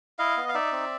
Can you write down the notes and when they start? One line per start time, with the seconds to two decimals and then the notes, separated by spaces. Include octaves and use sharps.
0.19 E4 D#5 F5
0.37 B3
0.49 F5
0.54 D#4 D5 E5
0.72 C4